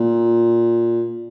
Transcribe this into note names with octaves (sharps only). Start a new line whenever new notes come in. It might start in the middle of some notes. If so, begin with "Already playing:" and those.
Already playing: A#2